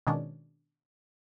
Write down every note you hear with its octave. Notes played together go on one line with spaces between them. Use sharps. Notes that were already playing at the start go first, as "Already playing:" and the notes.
B2 D#3 G#3 C#4 D4